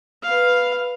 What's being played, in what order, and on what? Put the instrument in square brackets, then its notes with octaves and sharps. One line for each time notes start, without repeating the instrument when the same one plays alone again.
[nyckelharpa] B4 F5